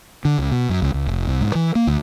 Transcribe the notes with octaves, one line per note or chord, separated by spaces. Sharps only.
D3
C#2
B2
F#2
C#2
C#2
F1
C2
G#2
E3
A#3
D2